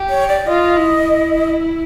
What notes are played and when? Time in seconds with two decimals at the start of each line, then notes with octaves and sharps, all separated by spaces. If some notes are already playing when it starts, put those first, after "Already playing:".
Already playing: G4
0.09 C#5
0.28 D5
0.47 F4 D#5
0.76 E4